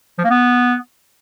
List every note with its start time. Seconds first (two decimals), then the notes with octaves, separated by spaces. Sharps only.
0.18 F3
0.24 A#3
0.30 B3